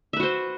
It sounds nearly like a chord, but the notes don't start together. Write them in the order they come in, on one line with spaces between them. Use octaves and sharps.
E5 B4 F#4 C5